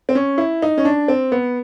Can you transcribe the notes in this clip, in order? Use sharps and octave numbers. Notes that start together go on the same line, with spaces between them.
C4
C#4
E4
D#4
C#4
D4
C4
B3